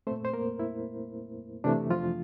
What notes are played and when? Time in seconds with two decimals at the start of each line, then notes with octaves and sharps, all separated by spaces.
0.07 A3 C4 C5
0.11 A#2
0.25 C5
0.33 A#3 A#4
0.59 E4
1.64 C3 E3 A3 D4
1.90 F3 F4